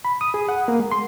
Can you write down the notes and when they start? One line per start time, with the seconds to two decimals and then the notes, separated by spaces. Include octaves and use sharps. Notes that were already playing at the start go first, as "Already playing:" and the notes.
0.05 B5
0.21 D#6
0.34 G#4
0.49 F#5
0.68 A#3
0.79 G#3
0.92 C6